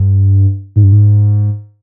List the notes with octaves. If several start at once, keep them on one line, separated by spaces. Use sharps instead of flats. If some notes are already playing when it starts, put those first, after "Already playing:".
Already playing: G2
G#2
G2
G#2